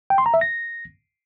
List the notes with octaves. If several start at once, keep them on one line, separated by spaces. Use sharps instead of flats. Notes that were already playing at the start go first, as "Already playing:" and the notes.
G5
C6
A#5
E5
A#6